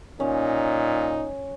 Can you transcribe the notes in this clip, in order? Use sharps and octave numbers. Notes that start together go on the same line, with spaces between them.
A#2 C#4 D#4